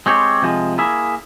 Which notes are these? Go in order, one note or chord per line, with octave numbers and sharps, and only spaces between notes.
G#3 C4 G4 C#5
C3 F3 G#3
A#3 E4 G#4 E5